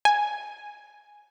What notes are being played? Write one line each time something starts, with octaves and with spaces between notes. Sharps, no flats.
G#5